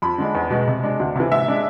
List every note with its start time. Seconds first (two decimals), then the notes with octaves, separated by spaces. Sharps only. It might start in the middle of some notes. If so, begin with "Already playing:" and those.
0.02 F2 B5
0.18 D3 G#3 D4
0.35 E2
0.50 B2 G#3
0.68 C3
0.83 G#3 D4
1.00 D2
1.16 C3 E3
1.31 G#2 E5
1.48 G#3 D4